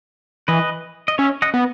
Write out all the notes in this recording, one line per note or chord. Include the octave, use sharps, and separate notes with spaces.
E3 B4 D#5
D#5
C#4 C#5 E5
D#5 F#5
B3